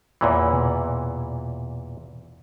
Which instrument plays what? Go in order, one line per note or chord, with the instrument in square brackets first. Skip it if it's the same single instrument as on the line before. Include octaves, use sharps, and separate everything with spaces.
[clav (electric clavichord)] E2 A#2 E3 [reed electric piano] C#5 D5 B5
[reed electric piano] B2